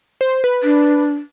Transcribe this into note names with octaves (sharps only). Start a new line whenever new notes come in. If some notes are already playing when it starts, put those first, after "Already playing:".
C5
B4
D4